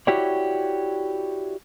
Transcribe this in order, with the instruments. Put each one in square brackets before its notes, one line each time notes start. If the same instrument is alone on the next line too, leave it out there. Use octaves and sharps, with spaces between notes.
[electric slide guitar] E4 F#4 G4 C#5 D5